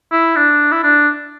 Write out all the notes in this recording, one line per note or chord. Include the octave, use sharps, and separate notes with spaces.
E4
D4
E4
D4